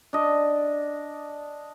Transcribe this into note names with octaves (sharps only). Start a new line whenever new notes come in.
D4 D#5